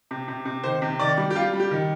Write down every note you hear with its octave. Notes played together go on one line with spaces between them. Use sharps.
C3
C3
C3
D#3 C5
C3
D#3 D5
G3
G4
G3 F4
G3
G4
D#3